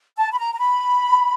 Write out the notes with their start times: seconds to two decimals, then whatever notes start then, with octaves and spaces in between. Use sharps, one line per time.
0.17 A5
0.32 B5
0.38 A#5
0.54 A#5
0.59 B5